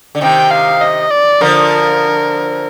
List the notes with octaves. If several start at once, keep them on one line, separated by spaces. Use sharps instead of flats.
D3
C3 D#3 G5
F5
D#5
D5
D3 F3 A#4